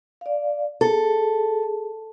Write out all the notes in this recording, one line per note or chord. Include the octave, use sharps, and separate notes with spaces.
D5 F5
G#4 A4